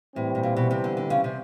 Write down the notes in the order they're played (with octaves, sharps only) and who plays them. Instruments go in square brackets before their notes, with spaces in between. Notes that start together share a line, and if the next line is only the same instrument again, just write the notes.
[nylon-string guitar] A2 [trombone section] E3 G3 C4
[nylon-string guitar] A2
A#2
B2
C3
D3
D3
C#3
C3